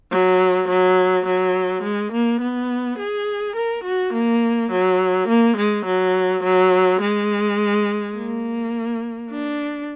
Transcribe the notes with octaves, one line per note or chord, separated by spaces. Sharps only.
F#3
F#3
F#3
G#3
A#3
B3
G#4
A#4
F#4
A#3
F#3
A#3
G#3
F#3
F#3
G#3
A#3
D4